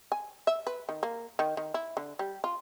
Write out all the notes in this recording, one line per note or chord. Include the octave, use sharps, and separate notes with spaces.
G#5
E5
B4
D#3
A#3
D#3
D#3
E4
D3
G3
F4